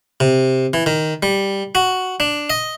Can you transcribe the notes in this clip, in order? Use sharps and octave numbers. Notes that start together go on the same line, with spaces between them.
C3
E3
D#3
G3
F#4
D4
D#5